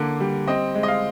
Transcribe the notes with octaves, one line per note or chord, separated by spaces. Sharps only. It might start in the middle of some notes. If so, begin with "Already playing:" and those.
Already playing: D3 A#3
G3
C4 D#5
G#3
D#5
F5